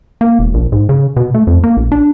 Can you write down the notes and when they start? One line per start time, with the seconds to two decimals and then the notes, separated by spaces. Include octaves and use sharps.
0.21 A#3
0.39 E1
0.54 A#1
0.72 G#2
0.89 C#3
1.17 B2
1.34 A3
1.47 F2
1.64 A#3
1.77 A#1
1.92 D4